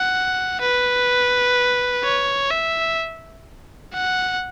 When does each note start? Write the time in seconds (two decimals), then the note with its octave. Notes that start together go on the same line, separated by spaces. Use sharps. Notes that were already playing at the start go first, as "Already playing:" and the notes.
Already playing: F#5
0.61 B4
2.04 C#5
2.50 E5
3.93 F#5